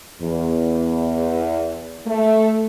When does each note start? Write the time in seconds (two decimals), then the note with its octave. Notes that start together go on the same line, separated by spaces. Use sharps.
0.21 E2
2.06 A3